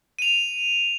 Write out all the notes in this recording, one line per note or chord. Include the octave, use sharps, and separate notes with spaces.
D#7 F7